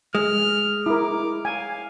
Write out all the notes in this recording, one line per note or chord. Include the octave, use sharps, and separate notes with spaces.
G#3 F6
E4 A#4 D6
F5 G#5